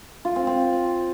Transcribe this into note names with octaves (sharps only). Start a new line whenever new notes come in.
F4
C4
C4